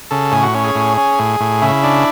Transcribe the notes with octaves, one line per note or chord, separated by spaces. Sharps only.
C#3 A4
A2 G#4
F#4
C#4
G#4
A2
C#4
A2
A2
C#3 E4
D4